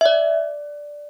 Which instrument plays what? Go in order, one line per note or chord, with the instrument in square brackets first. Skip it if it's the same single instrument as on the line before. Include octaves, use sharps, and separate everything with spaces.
[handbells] E5
D5